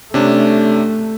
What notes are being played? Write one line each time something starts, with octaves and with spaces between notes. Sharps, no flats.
C3 A3 C#4 D4